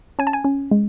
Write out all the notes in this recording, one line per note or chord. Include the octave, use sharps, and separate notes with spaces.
C#4 G#5
A5
G#5
C#4
G#3